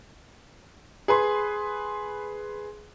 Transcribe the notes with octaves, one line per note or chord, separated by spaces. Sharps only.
G#4 B4 C6